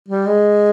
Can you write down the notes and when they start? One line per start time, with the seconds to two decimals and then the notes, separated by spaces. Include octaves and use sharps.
0.09 G3
0.27 G#3